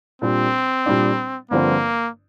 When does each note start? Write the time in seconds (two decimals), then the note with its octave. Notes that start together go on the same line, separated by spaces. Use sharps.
0.22 A#2 G3 C4 D4
0.86 A#2 G3 D4
1.51 G1 G2 D3 F3 A#3 C4